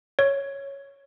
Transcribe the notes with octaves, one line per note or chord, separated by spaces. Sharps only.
C#5